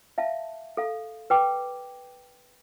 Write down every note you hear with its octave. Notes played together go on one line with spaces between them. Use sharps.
E5 F5 A5
A4 F5
B4 G5 D6